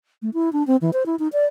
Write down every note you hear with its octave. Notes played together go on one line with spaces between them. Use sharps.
A3
E4
D4
C4
E3
C5
E4
D#4
D5